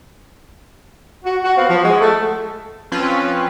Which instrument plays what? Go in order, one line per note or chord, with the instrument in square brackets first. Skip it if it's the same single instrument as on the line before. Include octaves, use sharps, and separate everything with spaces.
[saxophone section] F#4
F#4
B3 C4 F#4 F5
F3
G#3 F#4
A3
[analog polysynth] F3 C4 C#4 F4 B4